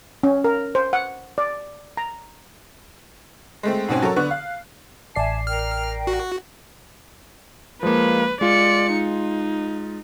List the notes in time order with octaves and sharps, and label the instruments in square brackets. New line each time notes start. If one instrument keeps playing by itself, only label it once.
[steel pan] C#4
A#4
C5
F#5
D5
A#5
[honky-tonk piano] G#3 A3 C4
G#2 B2 C4 C#4
F#3 A4 A#4 C#5
D3 B3 C#6 F#6
F5
[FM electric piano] A1 D5 C7 [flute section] E5 G#5 A5
[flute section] A#4 G5 [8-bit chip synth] F6
[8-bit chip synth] F#4
[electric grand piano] F3 G#3 A#3 [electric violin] B4
[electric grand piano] G#3 F4 [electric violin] D5 C#7
[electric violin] D#4